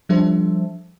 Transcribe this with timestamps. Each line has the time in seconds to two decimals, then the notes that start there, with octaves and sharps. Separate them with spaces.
0.09 F3 G3 D4 A4 C5 E5